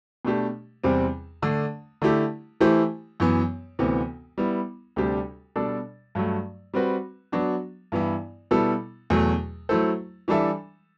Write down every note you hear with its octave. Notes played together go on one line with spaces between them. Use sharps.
B2 A3 D4 G4
E2 C3 G3 C4
D3 A3 D4
D3 A3 E4 G4
E3 A3 E4 G4 C5
F#2 E3 B3
D2 C3 E3 B3
G3 B3 E4
D2 C3 G3 D4 G4
B2 G3 D4 A4 D5
G2 F#3 A3
G3 C4 F#4 B4
F#3 B3 D4 F#4
G2 E3 B3 E4
B2 G3 B3 E4 A4
E2 B2 F#3 A3
F#3 A3 E4 A4 C5
E3 G3 D4 A4 E5